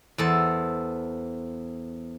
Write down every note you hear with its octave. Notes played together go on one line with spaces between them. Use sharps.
E2 A4 C5